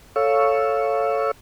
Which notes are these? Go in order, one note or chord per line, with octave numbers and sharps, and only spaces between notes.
A4 C#5 F5 C#6 E6